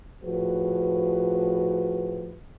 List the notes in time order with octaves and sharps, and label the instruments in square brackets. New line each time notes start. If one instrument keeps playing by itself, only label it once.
[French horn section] A2 F3 F#4 G#4 B4